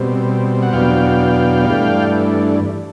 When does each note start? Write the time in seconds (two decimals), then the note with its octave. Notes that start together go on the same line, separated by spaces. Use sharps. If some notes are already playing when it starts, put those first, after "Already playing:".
Already playing: B2 G3 C4
0.62 F#5
0.73 E2 B2 F#3 B3 D4 F5 G5
1.67 G2 E3 A3 D4